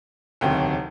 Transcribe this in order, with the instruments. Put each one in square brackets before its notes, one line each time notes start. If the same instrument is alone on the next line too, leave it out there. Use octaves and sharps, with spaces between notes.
[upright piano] E1 D2 C3 D#3 F#3 G5